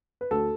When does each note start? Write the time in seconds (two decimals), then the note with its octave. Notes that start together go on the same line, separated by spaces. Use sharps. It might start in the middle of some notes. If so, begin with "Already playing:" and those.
0.21 B4
0.31 D2 F#4 A4